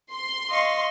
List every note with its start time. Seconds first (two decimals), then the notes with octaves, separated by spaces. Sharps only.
0.13 C6
0.49 D#5 F5 C#6